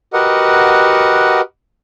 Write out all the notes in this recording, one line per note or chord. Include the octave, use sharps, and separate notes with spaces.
F#4 G4 A#4 B4 D#5 F#5